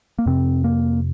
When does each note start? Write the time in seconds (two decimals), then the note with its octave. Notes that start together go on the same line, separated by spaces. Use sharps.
0.19 A#3
0.26 F2 C3 C4
0.64 A#3